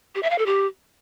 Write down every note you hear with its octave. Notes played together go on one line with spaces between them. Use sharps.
G4
E5
F5
A4
G4